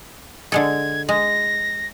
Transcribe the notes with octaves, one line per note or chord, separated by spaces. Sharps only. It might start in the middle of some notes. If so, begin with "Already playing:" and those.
D3 G#3 A4 G#6
G#3 A#6